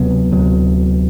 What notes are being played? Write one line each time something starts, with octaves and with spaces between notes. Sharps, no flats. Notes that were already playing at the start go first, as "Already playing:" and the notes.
Already playing: D2 C3 F#3 B3
D2 C3 F#3